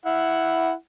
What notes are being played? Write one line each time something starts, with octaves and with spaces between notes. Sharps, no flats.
E4 F#5